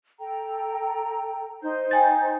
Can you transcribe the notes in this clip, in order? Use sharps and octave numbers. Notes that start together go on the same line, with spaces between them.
A4 G5 A#5
D#4 C5 G6
G5 G#5 A6